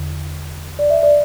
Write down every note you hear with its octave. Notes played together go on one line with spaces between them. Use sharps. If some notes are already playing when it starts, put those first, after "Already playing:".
Already playing: E2 D3
D5
E5
D5